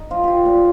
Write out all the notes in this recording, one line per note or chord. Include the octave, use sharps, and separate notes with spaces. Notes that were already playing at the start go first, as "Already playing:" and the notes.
Already playing: D#4
F3 F4
F4 G4
A#2 A#4